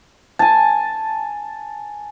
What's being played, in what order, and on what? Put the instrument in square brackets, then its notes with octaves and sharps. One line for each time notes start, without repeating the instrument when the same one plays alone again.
[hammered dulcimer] G#5 A5